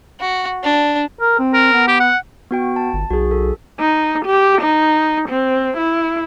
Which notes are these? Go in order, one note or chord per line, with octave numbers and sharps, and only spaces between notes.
F#4
D4
A#4
C4
A#4
B3
G4
F#5
B3 F#4 G5
A5
G1
B1 F#4 G#4
A4
D#4
G4
D#4
C4
E4